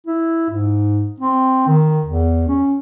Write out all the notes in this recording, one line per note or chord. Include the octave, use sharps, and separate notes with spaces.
E4
G#2
C4
D#3
E2
C#4